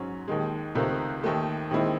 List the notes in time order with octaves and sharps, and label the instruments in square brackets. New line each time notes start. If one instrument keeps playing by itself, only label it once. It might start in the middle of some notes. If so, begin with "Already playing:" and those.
Already playing: [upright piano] G#2 F#3 C#4
D#2 D#3 G#3
C#2 C3 D#3 A3
D#2 D#3 A3
D#2 D#3 G#3 C4 E4